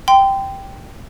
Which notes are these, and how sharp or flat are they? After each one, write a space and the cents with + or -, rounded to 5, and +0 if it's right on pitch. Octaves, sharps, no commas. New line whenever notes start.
G5 -5 C6 -30